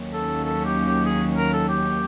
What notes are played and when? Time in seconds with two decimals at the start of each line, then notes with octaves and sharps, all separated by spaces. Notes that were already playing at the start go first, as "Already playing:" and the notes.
Already playing: D#2 D#3 F#3 A#3 C#4
0.13 A4
0.45 A4
0.65 G4
0.86 G4
1.06 G#4
1.37 A#4
1.53 A4
1.69 G4